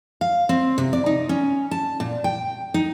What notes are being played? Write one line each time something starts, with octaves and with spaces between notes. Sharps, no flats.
F5
C4
C3
D5
D#4
C#4
A5
A#2
G5
D#4